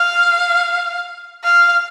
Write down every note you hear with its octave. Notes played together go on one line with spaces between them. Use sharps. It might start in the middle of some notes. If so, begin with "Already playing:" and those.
Already playing: F5
F5